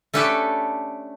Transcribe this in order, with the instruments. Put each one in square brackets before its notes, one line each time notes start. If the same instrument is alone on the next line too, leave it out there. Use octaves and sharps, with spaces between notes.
[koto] A3 C#4 D4 G4 A4 B4